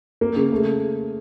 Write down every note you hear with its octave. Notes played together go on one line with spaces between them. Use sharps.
A#3
C#3
A3